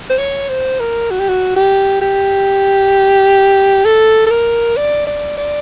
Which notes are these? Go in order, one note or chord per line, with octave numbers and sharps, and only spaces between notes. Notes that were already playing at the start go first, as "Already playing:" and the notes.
C5
C#5
C5
A#4
F#4
G4
F#4
G4
G4
A4
A4
A#4
D5
D5
D5